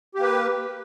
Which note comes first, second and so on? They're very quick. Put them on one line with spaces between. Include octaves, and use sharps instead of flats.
G4 A#3 B4